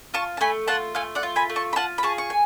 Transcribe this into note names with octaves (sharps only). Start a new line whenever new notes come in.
F4 A5 C#6
A5
A3 G#5 B5
F4 F#5 A5
A3 F5 G#5
D5 F#5
F4
G#5 B5
A3
A5 C#6
B5
F4 F#5 A5
B5
G#4 A5 C#6
C#6
G#5